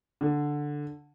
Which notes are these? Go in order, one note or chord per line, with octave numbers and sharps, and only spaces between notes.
D3